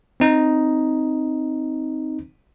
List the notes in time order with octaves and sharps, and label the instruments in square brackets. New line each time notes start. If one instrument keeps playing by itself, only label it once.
[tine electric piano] C4 D#4